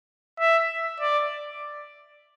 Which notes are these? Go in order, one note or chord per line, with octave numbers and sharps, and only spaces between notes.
E5
D5